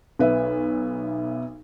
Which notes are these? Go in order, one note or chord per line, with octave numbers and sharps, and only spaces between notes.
B1 B4 E5